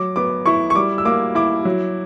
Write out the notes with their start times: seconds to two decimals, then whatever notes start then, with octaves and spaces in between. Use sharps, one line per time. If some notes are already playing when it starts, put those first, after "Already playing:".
Already playing: F#3 D6
0.16 B3 D6
0.46 E4 C#6
0.70 C#6
0.75 G3 D6
0.98 E6
1.05 A#3 D6
1.35 E4 D6
1.65 F#3